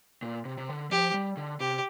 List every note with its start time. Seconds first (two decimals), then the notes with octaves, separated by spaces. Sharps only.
0.22 A#2
0.45 C3
0.58 C3
0.69 D3
0.91 F3 G4
1.14 G3
1.37 D3
1.60 C3 G4